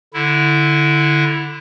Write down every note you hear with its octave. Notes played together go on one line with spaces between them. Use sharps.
D3 E4